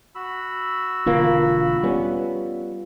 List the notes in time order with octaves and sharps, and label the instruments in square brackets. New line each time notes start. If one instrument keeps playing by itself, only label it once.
[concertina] F#4 B5 E6
[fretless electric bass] E1 D3 A#3 [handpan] F4
[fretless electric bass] G3 B3 C#4